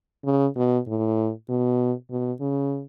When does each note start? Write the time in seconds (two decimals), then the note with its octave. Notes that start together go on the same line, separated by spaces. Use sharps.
0.25 C#3
0.56 B2
0.87 A2
1.49 B2
2.11 B2
2.40 C#3